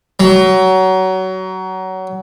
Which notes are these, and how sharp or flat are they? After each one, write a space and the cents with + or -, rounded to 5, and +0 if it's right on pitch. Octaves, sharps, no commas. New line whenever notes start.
F#3 +25